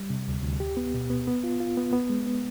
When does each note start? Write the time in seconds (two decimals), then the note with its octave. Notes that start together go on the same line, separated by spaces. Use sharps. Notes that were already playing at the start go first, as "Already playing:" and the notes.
Already playing: G3
0.10 C3
0.28 D2
0.43 D2
0.60 G4
0.77 B3
0.94 B2
1.10 B3
1.27 B3
1.44 F4
1.60 F4
1.77 B3
1.93 B3
2.10 G#3
2.26 B3